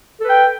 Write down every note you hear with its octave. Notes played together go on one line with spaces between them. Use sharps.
A4 B4 G5